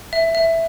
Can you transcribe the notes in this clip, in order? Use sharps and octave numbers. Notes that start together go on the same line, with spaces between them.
E5
E5